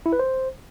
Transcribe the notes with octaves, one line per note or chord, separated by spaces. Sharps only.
E4
B4
C5